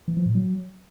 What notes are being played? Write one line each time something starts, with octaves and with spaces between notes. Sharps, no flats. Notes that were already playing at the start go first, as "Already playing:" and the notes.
E3
F3
A2
F#3